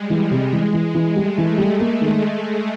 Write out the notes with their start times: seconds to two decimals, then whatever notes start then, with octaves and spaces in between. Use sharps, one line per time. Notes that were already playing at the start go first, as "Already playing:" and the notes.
Already playing: G3 G#3
0.10 E3
0.31 C3
0.53 E3 G#3
0.73 E3
0.95 E3
1.16 G3 A3
1.38 E3
1.58 G3
1.80 A#3
2.01 D#3